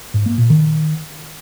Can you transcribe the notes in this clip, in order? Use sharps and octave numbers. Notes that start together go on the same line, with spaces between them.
G#2
A#3
A#2
D#3